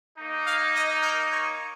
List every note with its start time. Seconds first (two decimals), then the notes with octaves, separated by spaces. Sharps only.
0.18 A#3 D#4
0.45 F5
0.74 D#5
1.01 A#4
1.30 C#5